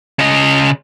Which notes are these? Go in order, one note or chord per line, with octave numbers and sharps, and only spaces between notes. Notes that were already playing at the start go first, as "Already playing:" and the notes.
C#3 D#5